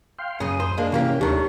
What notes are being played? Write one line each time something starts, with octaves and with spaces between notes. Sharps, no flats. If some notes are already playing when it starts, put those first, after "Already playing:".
F5 G5 C6
C#2 F#2 C#3 D#6
C5
G#3 A#3 D4
G#2 C3 E3 A#3 C#4 G4
D#2 A2 D#3 A3 D4 G4